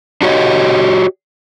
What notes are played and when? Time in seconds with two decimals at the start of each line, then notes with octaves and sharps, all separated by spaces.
0.22 D4 F#4 G4 C#5 D#5